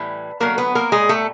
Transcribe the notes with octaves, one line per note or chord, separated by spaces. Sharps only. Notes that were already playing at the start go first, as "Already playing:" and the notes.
Already playing: A2 E3 G3
D3 F#3 A3 A#3 A#4
B3 B4
A#3 A#4
A#2 G3 G#3 G#4
A3 A4